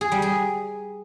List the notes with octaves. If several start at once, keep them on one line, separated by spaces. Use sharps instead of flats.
G#4
G3
G#4